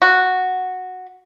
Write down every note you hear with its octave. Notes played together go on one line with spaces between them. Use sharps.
F#4